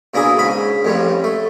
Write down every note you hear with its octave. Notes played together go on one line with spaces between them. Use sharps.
B2 A#3 D4 E4 G#4
G#2 C#3 B5
A1 F2 A2 G3
A3